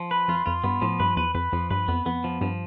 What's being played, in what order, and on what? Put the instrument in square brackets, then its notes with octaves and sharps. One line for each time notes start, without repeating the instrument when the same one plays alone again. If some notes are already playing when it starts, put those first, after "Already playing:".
Already playing: [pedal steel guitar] F3
B4
[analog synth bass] F2 [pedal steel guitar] F4
[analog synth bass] F2 [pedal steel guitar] F4
[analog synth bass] G2 [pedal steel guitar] B3
[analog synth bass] A2 [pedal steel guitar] F3
[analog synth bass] G2 [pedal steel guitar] B4
[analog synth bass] E2 [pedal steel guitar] B4
[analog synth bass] F2 [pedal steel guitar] B4
[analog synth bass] F2 [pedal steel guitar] F3
[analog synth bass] G2 [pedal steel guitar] B4
[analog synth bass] F2 [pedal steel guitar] B3
[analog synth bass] F2 [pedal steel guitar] B3
[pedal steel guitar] F3
[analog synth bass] G2 [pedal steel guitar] F3